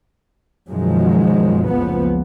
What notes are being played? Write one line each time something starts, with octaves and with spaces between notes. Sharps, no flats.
F#2 B2 D#3 F3 F#3 G#3
F#1 C#2 F3 B3